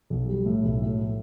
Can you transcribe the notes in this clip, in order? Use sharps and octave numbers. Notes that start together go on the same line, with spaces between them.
B1
G3
A2
B1
A2